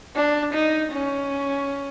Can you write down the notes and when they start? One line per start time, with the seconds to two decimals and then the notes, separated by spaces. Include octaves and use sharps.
0.16 D4
0.54 D#4
0.93 C#4